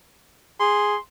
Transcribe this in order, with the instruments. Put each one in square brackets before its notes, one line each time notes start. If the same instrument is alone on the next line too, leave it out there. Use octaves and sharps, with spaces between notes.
[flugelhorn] G#4 [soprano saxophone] C6